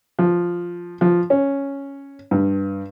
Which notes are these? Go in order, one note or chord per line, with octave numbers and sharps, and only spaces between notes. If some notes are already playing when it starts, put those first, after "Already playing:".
F3
F3
C#4
G2